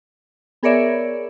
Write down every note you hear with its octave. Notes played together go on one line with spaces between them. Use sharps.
B3 G#4 A#4 C#5 D5 E5